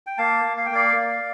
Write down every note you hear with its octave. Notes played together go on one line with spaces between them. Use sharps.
G5
A#3 F5 A5
A#3
F5
G5
A#3 D5 F5
A#3